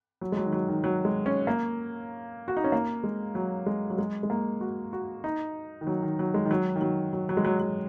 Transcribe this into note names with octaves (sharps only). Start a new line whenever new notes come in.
F#3
G#3
F#3
D#3
F#3
D#3
F#3
G#3
C#4
A#3
F#4
D#4
C#4
A#3
G#3
F#3
G#3
F#3
G#3
G#3
A#3
F#4
F#4
D#4
D#3
F#3
D#3
F#3
G#3
D#3
F#3
D#3
F#3
F#3
F#3
G#3
F#3
F#3